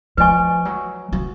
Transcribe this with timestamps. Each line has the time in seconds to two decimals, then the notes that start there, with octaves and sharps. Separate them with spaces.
0.17 F3 B4 D#5 G#5 C#6
0.65 F#3
1.12 F#3